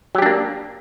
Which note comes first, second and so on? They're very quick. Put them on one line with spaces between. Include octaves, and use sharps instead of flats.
F#3 G4 D4 A#3